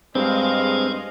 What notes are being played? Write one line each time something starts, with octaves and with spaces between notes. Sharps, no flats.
G2 G#3 C4 D4 G#4 D#5 F5